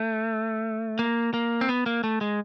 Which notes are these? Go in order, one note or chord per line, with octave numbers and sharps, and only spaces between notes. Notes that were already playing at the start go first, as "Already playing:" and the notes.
Already playing: A3
A#3
A#3
C4
B3
A#3
A3
G#3